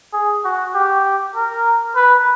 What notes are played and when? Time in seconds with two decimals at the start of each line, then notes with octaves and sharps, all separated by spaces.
0.13 G#4
0.45 F#4
0.74 G4
1.35 A#4
1.96 B4